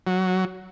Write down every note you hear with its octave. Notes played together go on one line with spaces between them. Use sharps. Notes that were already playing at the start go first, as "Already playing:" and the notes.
F#3